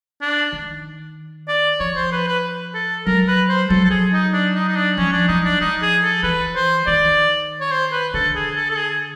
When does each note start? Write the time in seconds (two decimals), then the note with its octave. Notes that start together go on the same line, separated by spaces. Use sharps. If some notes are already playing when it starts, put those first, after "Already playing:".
0.21 D4
0.52 D#3
1.48 D5
1.80 F3 C#5
1.96 C5
2.12 B4
2.28 B4
2.74 A4
3.06 F#3 A#4
3.28 B4
3.49 C5
3.70 F#3 A4
3.84 A4
3.90 G#4
4.13 D#4
4.33 D4
4.55 D#4
4.68 D#4
4.75 D4
4.97 F3 C#4
5.12 D4
5.28 F#3 D#4
5.44 D4
5.61 F3 D#4
5.82 G#4
6.03 A4
6.23 E3 B4
6.55 C5
6.87 D#3 D5
7.60 C#5
7.71 C5
7.92 B4
8.14 D3 A4
8.36 G#4
8.56 A4
8.70 A4
8.77 G#4